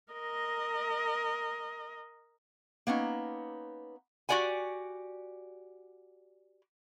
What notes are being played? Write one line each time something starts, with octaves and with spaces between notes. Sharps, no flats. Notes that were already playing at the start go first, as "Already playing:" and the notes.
A#4 D#5
A#3 B3 C#4 D#4
F#4 G4 D5 F#5 G#5